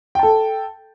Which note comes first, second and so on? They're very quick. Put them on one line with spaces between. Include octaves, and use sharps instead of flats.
G5 A5 A4